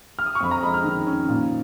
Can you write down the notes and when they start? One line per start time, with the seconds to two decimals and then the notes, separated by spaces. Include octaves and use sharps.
0.19 F6
0.26 D#6
0.35 C#6
0.41 F2 B5
0.51 A#5
0.63 G#3 B5
0.74 F6
0.84 D#3
1.07 C#4
1.28 A#2